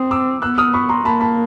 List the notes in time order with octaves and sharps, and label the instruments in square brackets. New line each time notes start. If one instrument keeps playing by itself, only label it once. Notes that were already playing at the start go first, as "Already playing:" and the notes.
Already playing: [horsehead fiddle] C4 [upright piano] D#6
[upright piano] D6 E6
[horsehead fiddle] B3 [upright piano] E6 F#6
[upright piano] D#6 F6
B5 C#6
A#5 C6
[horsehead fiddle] A#3 [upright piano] A5 B5
[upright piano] A5 B5